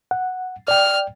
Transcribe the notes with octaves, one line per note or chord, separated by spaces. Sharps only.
F#5
D5 G5 F6